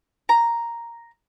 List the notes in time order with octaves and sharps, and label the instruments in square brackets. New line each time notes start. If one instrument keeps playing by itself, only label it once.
[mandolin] A#5